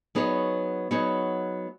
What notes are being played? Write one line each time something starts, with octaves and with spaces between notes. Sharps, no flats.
F#3 B3 D#4 G#4 C#5
F#3 B3 D#4 G#4 C#5